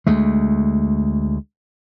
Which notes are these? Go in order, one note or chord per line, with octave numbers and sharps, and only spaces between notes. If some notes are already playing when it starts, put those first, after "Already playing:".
D2 G#3 A3